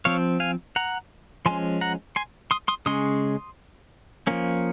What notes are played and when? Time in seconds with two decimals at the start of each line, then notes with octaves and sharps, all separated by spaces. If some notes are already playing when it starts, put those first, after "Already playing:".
0.05 F3 C4 C#5 F5
0.40 F5 G#5
0.76 F#5 A#5
1.46 F3 G#3 C#4 G#5 C6
1.81 F#5 A#5
2.16 G#5 C6
2.51 C6 D#6
2.68 C6 D#6
2.86 C#3 G#3 C#4 C6 D#6
4.27 F3 A#3 C#4